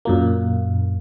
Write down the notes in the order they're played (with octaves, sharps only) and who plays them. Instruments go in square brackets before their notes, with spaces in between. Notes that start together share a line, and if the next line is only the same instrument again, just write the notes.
[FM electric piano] F#2 A#2 A#3